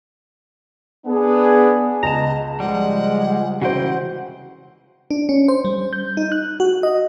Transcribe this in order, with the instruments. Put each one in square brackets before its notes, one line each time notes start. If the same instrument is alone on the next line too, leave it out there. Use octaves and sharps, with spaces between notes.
[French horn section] B3 [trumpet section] D4 G#4
[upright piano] C#2 [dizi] D#5 [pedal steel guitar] A5 A#5
[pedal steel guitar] F3 G3 [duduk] G#3 [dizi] F#5
[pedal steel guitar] C#3 E3 G5 [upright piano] F#4 C5 [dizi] F#5
[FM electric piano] D4
C#4
C5
G3
G6
D#4
F#6
F#4
D#5